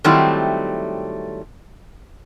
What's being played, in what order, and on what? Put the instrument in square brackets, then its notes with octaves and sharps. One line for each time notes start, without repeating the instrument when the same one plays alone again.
[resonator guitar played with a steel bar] D#3 F#3 G3 A3 C4 E4